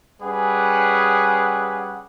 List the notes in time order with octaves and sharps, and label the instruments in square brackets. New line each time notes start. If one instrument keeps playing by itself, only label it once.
[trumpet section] G3 C#4 G#4 B4 F#5